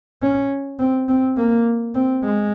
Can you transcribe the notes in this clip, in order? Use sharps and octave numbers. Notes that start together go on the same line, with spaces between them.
C#4
C4
C4
A#3
C4
G#3